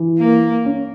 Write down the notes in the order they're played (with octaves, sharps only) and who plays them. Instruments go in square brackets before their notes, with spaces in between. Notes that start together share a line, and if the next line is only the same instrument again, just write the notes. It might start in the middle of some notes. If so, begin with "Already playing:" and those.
Already playing: [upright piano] E3
[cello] A#3
[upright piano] C#4